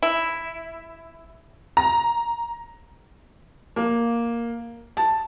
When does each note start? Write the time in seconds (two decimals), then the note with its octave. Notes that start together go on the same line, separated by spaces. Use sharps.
0.03 E4
1.77 A#5
3.76 A#3
4.97 A5